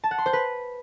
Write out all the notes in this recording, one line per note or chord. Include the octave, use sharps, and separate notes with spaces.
A5
F#5
C6
C5
B4